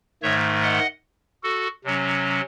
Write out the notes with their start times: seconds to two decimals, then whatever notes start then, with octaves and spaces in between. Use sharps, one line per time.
0.23 G#2 D#3 A3 C#5 E5
0.62 D#5 F#5
1.43 F#4 A4
1.84 C3 F#3 C#4